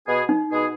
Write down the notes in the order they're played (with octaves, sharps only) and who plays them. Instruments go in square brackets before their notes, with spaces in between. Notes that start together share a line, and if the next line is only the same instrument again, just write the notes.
[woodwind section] B2 B3 G#4
[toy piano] D#4
[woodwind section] B2 B3 G#4